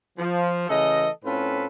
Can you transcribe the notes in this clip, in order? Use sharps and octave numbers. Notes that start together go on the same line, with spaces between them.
F3
C#3 E3 A3 A4 D#5
A2 C4 C#4 F4 A4 B4